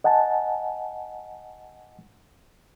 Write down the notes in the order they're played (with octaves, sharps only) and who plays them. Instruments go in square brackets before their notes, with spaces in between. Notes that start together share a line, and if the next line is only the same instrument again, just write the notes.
[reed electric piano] D#5 F#5 G#5 A5